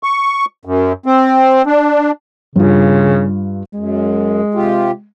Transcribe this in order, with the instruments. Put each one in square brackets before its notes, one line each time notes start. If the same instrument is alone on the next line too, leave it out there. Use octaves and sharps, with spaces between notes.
[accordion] C#6
F#2
C4
D4
[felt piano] G2 F4 [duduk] C#3
[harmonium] F#2 [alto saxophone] G#3
[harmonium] C3 F4 G4